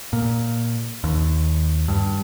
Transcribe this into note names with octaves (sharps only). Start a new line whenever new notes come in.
A#2
D#2
G2